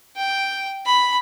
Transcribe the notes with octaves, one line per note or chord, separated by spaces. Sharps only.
G5
B5